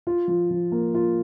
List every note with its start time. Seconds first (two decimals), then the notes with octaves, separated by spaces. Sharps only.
0.07 F4
0.28 F3
0.51 F3
0.72 A#3
0.95 F4